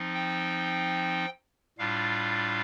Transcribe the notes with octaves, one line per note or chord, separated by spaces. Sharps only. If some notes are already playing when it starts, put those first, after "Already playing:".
Already playing: F3 C4 D#4
G5
A2 G3 D4 F4 F5